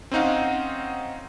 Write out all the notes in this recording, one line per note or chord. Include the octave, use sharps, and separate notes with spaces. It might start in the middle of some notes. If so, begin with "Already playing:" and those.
C4 C#4 D#4 F5 F#5